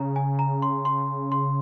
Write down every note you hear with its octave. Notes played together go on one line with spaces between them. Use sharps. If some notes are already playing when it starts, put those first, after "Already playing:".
Already playing: C#3 A#5
G#5
A#5
C6
C6
C6